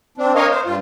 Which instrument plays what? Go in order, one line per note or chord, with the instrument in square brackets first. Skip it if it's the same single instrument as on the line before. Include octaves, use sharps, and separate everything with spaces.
[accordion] C4 D4
A#4 C#5 D#5 F5
C5
G2 F4